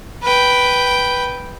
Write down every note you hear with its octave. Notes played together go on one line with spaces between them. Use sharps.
B4 G5